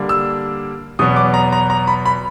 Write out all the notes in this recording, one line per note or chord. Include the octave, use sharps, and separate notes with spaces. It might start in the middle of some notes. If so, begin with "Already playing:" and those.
Already playing: D3 G3 A#3 D4
E6
E2 B2 F#3 B3 D#6
D6
A#5
A#5
A#5
B5
B5